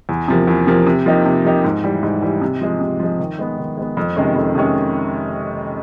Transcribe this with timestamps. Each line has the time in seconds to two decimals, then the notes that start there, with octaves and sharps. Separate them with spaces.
0.09 E2
0.28 C3 F3 A#3
0.47 E2
0.67 C3 F3 A#3
0.87 C3
1.06 F3 A#3 D#4 G4
1.26 C3
1.45 F3 A#3 D#4 G4
1.64 G#2
1.84 E3 G3
2.03 G#2
2.22 E3 G3
2.41 C3
2.61 F3 G#3
2.81 C3
3.00 F3 G#3
3.19 D#3
3.39 G#3 B3
3.58 D#3
3.77 G#3 B3
3.97 F2
4.16 C3 D#3 G#3 C#4
4.36 F2
4.55 C3 D#3 G#3 C#4